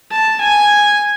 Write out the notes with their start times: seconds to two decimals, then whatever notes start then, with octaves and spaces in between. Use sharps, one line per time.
0.11 A5
0.41 G#5